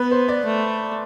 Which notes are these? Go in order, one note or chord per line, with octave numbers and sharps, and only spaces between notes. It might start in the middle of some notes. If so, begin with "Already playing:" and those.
Already playing: B3 B4
C5
D5
A3